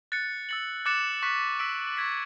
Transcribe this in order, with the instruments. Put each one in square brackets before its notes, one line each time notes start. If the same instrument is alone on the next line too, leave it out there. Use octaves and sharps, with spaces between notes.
[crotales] F#6 A6 C#7
E6 A6 C#7 F#7
D6 F#6 A6 C#7 E7
C#6 F#6 B6
E6 B6 D7
C#6 E6 G#6 B6